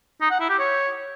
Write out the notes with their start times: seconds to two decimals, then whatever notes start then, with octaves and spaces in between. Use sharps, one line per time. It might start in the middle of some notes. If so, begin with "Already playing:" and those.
0.21 D#4
0.31 F#5
0.40 E4
0.50 G4
0.59 C#5